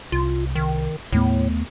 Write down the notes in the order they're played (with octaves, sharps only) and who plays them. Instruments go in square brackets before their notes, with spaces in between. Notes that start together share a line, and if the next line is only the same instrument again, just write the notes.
[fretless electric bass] C2 [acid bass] F4
[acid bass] D#3
[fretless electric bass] D#2 A3 B3 [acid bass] A2